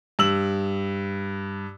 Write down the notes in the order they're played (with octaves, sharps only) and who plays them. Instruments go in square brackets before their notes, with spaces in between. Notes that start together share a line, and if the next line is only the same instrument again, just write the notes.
[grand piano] G2 E6 F#7